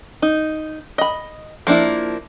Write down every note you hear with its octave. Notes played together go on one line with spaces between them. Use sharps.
D#4
D#5 B5
F3 A#3 D4 E4